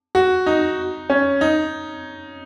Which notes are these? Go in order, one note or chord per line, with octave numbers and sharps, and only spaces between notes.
F#4
D#4
C#4
D#4